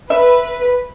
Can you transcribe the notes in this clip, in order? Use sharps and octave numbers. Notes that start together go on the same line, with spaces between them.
B4 E5